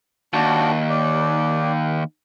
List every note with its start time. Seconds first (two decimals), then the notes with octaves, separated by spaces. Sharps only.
0.33 D#2 D4 F#4
0.90 D5